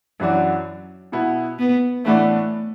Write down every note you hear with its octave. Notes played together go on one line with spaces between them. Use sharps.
F#2 E3 F#3 D4 F#4
B2 B3 E4
B3
A2 E3 A3 B3 D4